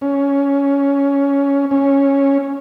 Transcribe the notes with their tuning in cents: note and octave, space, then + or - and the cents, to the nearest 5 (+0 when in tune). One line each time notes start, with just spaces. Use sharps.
C#4 +10
C#4 -5